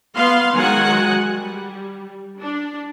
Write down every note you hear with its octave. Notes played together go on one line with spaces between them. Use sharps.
B3 F5 C6
D#3 F#3 G#3 F#4 F#5 G#5
G3
D4